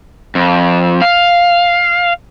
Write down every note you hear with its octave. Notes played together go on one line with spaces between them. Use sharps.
F2
F5